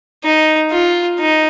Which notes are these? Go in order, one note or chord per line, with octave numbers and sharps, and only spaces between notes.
D#4
F4
D#4